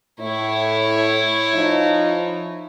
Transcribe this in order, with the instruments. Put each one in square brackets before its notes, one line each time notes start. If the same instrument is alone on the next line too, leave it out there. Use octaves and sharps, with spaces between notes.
[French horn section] A2 [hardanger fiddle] E4 C#5
[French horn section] F3 D#4